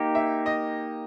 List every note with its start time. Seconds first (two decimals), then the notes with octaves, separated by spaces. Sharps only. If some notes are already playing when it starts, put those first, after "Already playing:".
Already playing: A#3 D#4 G4
0.15 E5
0.46 D#5